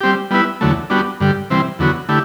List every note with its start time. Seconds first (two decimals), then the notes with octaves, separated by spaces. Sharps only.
0.01 G3 C4 G4
0.31 G3 B3 E4 B4
0.61 E2 D3 F#3 A3
0.90 G3 B3 D4 F#4
1.20 G2 D3 G3
1.50 C3 E3 G3 C4
1.79 E2 D3 F#3 B3 F#4
2.09 D3 A3 E4 G4